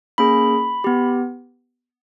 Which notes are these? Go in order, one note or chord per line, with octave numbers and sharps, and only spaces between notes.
A#3 C#4 G#4 B5
B3 G4